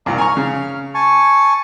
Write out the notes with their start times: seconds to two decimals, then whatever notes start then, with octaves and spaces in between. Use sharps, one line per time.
0.06 C2 A#2 F5 A#5
0.18 G#5 A#5 C#6 F6
0.37 C#3
0.94 G#5 A5 C#6